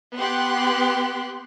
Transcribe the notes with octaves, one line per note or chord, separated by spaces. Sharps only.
B3 G4 C6 F#6